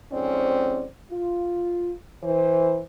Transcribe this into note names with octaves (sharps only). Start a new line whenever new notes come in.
F2 G#2 C4 C#4 C5 D5
F4
E3 C5